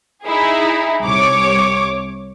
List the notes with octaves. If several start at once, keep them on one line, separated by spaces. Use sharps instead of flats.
D#4 E4 G#4
C2 C#5 D6